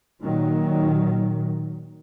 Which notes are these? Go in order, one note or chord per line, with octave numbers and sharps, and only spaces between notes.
A#2 D#3 F#3